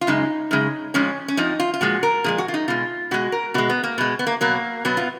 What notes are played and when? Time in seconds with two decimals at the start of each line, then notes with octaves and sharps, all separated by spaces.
0.01 F4
0.07 F#2 C#3 G#3 D#4
0.51 F#2 C#3 G#3
0.94 F2 F3 G#3 C#4
1.28 C#4
1.37 F2 F3 D#4
1.60 F4
1.74 F4
1.81 A#2 F3 G#3 F#4
2.03 A#4
2.24 A#2 F3 G#3 G#4
2.38 F#4
2.48 F4
2.54 D#4
2.68 B2 G#3 F4
3.11 B2 G#3 F#4
3.32 A#4
3.54 B2 G#3 F#4
3.69 B3
3.83 A#3
3.98 B2 G#3
4.19 B3
4.27 A#3
4.41 B2 F#3 A#3
4.85 B2 F#3 B3
4.97 F4